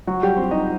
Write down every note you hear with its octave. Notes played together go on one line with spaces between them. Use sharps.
F#3 F#4
G3 G4
C4 C5
D#4 D#5